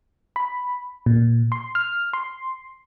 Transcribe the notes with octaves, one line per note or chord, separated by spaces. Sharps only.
B5
A#2
C6
F6
C6